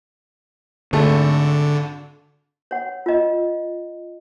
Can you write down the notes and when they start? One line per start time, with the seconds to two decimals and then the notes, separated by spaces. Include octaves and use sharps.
0.93 G#1 D3 A3
2.71 C#5 F#5
3.06 F4 D#5